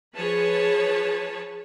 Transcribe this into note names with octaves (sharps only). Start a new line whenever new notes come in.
F3 G#4 B4 C#5 A5